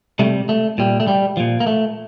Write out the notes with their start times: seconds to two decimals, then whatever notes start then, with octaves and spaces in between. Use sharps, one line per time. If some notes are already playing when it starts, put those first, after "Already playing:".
0.19 C3 G3 A3
0.49 A3
0.78 A#2 G3
1.00 A3
1.07 G3
1.37 A#2 F3
1.60 A#3
1.67 A3